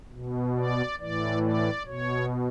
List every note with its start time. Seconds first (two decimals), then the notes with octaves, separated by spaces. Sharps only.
0.12 B2
0.56 D5
0.99 A2 E3 D5
1.44 D5
1.87 B2 C#5